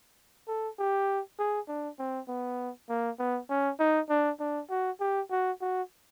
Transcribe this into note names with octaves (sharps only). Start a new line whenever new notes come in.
A4
G4
G#4
D4
C4
B3
A#3
B3
C#4
D#4
D4
D4
F#4
G4
F#4
F#4